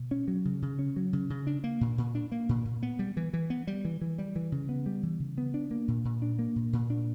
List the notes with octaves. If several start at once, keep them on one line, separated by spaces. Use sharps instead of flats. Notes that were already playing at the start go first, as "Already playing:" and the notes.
Already playing: B2
C#4
F#3
C#3
C#3
C#4
F#3
C#3
C#3
D4
A#3
A#2
A#2
D4
A#3
A#2
A#2
B3
G3
E3
E3
B3
G3
E3
E3
G3
E3
C#3
B3
G3
E3
C#3
B3
D4
A#3
A#2
A#2
D4
A#3
A#2
A#2
D4